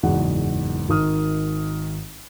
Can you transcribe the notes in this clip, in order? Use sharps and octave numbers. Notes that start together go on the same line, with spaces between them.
F#1 E2 G#2 F#4 F#5
G#1 D#3 D#6 F6